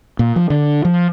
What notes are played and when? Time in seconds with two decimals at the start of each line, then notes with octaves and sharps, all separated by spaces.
0.19 A#2
0.36 F3
0.50 D3
0.85 F3